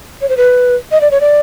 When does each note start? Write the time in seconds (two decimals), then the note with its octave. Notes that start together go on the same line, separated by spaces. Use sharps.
0.21 C#5
0.29 C5
0.37 B4
0.92 D#5
1.01 D5
1.11 C#5
1.21 D5